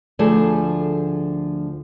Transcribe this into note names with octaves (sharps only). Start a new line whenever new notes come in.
D2 F3 G#4 A4